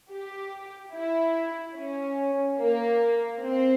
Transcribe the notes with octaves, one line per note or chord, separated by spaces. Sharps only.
G4
E4
C#4
A#3
C4